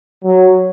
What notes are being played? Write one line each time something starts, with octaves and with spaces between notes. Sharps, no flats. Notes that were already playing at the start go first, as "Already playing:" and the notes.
F#3